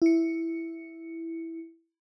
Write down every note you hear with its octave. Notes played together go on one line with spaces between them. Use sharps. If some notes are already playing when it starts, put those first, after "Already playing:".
E4 C#7